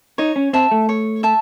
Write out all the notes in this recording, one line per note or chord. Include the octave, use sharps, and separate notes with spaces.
D#4 C#5
C#4
C4 E5 A5
A3
C#5
E5 A5